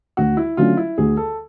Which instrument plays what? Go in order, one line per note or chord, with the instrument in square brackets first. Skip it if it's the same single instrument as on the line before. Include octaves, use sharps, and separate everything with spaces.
[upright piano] D2 [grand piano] F#4
[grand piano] E4
[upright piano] D3 F#3 A3 C#4 [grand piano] F4
[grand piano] E4
[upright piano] D2 [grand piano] G#4
[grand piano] A4